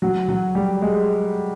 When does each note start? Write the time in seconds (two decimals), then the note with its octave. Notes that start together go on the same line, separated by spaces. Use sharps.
0.02 F#3 F#4
0.28 F#3 F#4
0.55 G3 G4
0.82 G#3 G#4